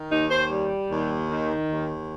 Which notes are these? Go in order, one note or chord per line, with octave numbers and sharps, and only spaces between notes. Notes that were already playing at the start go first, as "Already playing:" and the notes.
Already playing: D#3
D#2 D#4
C5
G3
D#2
D#3
D#2